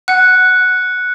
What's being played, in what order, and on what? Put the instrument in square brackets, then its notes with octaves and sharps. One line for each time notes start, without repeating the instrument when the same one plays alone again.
[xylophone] F#5 [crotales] F#6 C#7